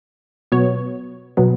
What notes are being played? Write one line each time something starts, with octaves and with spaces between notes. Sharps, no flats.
B2 F#3 B3 C#5
B2 F#3 B3